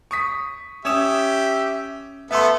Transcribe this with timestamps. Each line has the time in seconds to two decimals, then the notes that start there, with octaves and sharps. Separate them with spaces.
0.11 C#6 D#6 B6
0.85 C#4 G4 E5 D#6 E7
2.31 A3 B3 A4 E5 C6